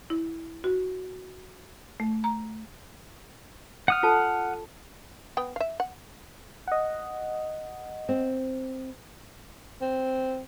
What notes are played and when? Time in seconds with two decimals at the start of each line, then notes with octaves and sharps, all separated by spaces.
0.10 E4
0.64 F#4
2.00 A3
2.24 A#5
3.88 F#5 D#6 F6
4.03 F4 A4 A5
5.37 B3 G5
5.56 E5 F5
5.80 F#5
6.68 D#5 F#5
8.09 C4
9.81 C4